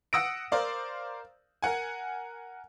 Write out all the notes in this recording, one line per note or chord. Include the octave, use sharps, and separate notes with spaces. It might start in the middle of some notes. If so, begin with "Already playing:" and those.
F#5 D#6 E6 A#6 D7
A#4 C5 D5 F5
A#4 F#5 G#5